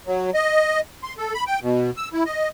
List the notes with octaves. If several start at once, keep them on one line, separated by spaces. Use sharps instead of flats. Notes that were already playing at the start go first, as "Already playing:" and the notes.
F#3
D#5
C6
A4
B5
G5
B2
E6
E4
D#5